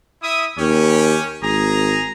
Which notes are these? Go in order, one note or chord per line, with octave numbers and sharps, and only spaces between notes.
E4 E5 D#6
D#2 C#4 G4
G#1 G#4 A#5